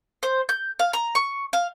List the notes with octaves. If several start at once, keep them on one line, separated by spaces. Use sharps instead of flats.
C5
G6
F5
A#5
C#6
F5